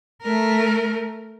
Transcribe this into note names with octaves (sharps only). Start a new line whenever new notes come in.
A3 A#4